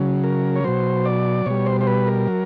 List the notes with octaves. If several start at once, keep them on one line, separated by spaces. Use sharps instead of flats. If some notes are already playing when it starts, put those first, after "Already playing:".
Already playing: C#3 F#3
A#4
C#5
B2 F#3 C5
D5
B2 G3 C#5
C5
C5
B4
A#4
F#3